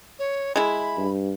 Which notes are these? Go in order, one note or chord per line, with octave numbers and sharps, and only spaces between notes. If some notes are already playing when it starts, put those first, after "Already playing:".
C#5
G#3 E4 B5
G2